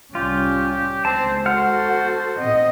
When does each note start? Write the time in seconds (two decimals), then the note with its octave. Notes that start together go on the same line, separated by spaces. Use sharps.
0.15 C2 G3 C#4 F4 G4
1.05 C#2 G#3 C4 C5 A5
1.46 F#4 A4 C5 F#5 F6
2.39 A#2 C4 D#5